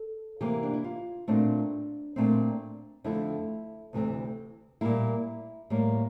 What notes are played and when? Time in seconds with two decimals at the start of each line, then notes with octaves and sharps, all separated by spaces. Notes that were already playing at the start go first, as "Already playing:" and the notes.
Already playing: A4
0.41 C3 E3 A#3 G4
0.63 D4
0.73 E4
0.84 F4
1.28 A#2 A3 C4 D4
2.16 A#2 A3 C4
3.04 F2 D3 A3 E4
3.93 D2 C3 E3 A3 C4
4.81 A#2 G3 A#3 E4
5.70 A2 G3 A#3